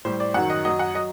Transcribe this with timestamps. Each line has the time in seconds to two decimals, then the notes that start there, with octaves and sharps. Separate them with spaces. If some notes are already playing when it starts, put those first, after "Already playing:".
0.05 A2 G3 C5
0.20 D5
0.34 F#2 D#3 F#3 F#5
0.50 D#5
0.65 F#2 F#3 D#5
0.79 F#5
0.95 F#3 D#5